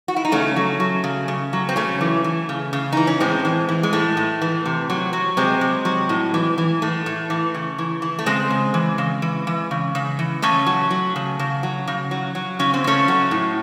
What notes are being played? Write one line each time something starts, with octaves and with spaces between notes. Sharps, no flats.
F#4
E4
D#4
C#3 A3 C#4
F#3
F#3
C#3
C#3
F#3
C4
C#3 A3 C#4
E3
E3
C#3
C#3
E3 D#4
C#4
A2 G#3 C4
E3
E3
G#3
A2 A3
A2
E3
C3
F#3
F#3
C3 G#3 C4
C3
F#3
A2
E3
E3
A2 A3
A2
E3
C#3
E3
E3
A3
C#3 G#3 C4
C#3
E3
C#3
E3
E3
C#3
C#3
E3
C#3 A3 C#4
F#3
F#3
C#3
C#3
F#3
C#3
F#3
F#3
C#3 C#4
C4
C#3 A3 C#4
F#3
A2